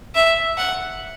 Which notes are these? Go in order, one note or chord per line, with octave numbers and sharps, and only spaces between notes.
E5
F#5